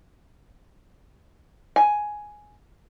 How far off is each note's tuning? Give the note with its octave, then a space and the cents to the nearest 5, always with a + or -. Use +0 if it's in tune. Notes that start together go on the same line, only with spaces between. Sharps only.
G#5 +5